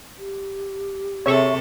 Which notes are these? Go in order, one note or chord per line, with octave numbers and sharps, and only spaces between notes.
G4
C3 C4 G#4 A4 C5 C#5 E5 C#6